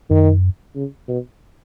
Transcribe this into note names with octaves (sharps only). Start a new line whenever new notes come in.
F#2 D#3
C#3
B2